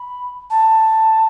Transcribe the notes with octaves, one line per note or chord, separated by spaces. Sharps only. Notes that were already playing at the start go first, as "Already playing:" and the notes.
Already playing: B5
A5